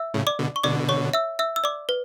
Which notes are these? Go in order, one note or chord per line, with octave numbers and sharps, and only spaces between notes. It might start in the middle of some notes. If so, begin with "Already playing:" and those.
Already playing: E5 E6
A2 C#3
D5 D6
B2 D3
C#6
B2 D3 D5 D6
C#5 C#6
E5 E6
E5 E6
E6
D5 D6
B4